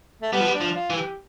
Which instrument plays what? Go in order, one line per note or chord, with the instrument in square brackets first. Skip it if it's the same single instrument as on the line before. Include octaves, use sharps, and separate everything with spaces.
[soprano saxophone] A3
[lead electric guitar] G3 [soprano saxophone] B3
[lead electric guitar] F3
G3
[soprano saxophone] D4
[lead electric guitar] F3
[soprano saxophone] F4
[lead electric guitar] E3
[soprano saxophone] G4